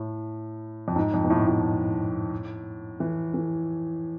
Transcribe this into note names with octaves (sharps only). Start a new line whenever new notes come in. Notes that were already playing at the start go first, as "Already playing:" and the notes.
Already playing: A2
F2
G#2
F2
B2
A2
A2
E3
E3